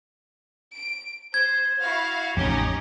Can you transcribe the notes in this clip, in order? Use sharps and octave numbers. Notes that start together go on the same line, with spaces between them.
D7
C5 G#6
E4 F#4 F5
A1 F2 C#4 D#4 G4